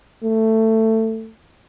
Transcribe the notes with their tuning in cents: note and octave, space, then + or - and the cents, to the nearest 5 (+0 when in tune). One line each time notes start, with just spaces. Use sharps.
A3 +15